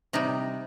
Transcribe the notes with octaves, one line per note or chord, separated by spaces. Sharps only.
C3 G3 D#4